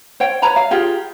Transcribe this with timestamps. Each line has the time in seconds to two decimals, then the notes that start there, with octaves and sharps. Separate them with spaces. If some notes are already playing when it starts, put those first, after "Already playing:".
0.20 C5 C#5 G5
0.42 B4 C#5 A#5 B5
0.56 F5
0.71 F4 G4 G#4